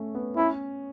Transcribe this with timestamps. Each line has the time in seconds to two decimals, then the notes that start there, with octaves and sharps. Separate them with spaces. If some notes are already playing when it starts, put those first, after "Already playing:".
Already playing: A3 C#4
0.15 B3
0.36 C#4 E4